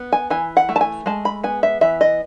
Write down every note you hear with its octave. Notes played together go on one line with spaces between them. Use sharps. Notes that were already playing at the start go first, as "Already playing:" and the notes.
Already playing: B3
G#5
E3 G#5
F#5
A3
A5
G#5
G#3 A5
B5
B3 G#5
E5
E3 E5
D#5